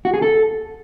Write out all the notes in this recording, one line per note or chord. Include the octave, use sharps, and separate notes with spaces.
F#4
G#4
A4